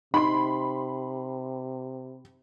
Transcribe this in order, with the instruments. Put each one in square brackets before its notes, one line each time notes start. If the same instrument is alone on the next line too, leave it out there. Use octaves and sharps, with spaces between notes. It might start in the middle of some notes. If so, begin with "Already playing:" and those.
[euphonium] C3 [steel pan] D#4 [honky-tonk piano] B5 C6